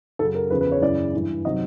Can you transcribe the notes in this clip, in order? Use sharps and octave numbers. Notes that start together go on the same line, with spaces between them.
F#2 C#3 F#3 A4
A#4
E2 C#3 F3 B4
B4
C#5
F#2 C#3 E3 D5
G2 E3
C3 D#3 F#3 D#5